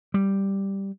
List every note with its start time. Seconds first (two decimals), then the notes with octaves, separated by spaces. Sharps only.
0.14 G3